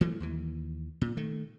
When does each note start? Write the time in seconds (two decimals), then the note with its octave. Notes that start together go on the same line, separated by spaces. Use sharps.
0.01 E3 F#3 A3
0.20 D#2 E3
1.01 A#2
1.17 D#3 A3